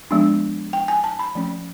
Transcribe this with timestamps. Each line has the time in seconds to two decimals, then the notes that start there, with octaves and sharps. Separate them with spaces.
0.11 F3 G#3 B3 D4
0.73 G5
0.88 G#5
1.04 A5
1.19 B5
1.35 F3 A3 C#4